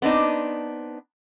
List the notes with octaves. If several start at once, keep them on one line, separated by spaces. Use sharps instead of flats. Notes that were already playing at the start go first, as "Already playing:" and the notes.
B3 C4 D4 D#4